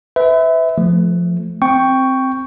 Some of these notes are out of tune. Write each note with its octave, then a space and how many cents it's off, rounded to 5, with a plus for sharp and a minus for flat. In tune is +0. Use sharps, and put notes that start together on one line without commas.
B4 +35 E5 -20
F3 +0 A3 -10
C4 +0 G5 +0 C#6 +5